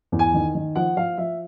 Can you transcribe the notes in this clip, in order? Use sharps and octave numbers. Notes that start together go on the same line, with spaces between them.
E2
G#5
D#3
D#3
F3 F#5
F3 F5
F3 E5